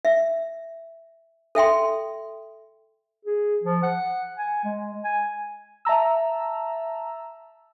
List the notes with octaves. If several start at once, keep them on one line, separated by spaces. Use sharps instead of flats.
E5
A4 E5 G5 C6
G#4
F3
F#5
G#5
G#3
G#5
E5 A5 A#5 E6